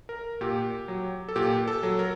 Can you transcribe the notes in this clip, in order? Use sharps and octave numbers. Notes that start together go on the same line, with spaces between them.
A#4
A#2 G4
F#3
A4
A#2 G4
A4
F#3
A#4